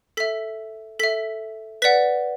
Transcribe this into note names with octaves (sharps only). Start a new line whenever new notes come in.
A4 E5 B6
A4 E5 B6
B4 D5 F#5 B6